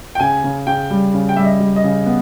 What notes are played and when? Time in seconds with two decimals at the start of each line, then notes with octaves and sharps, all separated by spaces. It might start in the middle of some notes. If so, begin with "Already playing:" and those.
0.15 G5
0.20 C#3 G#5
0.44 C#3
0.67 C#3 G5
0.91 G3
1.14 C#3
1.29 G5
1.36 G3 E5
1.45 D#5
1.60 G3
1.76 D#5
1.84 C#3
2.06 B3